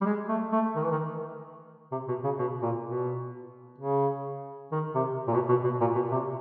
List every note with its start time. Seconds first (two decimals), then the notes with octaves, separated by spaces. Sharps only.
0.01 G3
0.05 G#3
0.28 A3
0.52 A3
0.76 D#3
0.83 E3
0.91 D#3
1.92 C3
2.08 B2
2.24 C#3
2.39 B2
2.62 A#2
2.85 B2
3.78 C#3
4.72 D#3
4.95 C3
5.28 A#2
5.34 B2
5.49 B2
5.64 B2
5.81 A#2
5.95 B2
6.11 C3